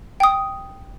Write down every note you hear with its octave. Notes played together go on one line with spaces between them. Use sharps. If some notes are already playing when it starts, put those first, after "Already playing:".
G5 D#6